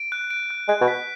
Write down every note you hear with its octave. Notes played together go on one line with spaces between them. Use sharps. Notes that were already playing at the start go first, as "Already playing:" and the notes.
Already playing: D7
F#6
D7
F#6
G#3 F#6
B2
B6